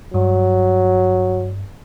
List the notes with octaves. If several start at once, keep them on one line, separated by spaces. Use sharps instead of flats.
G2 F#3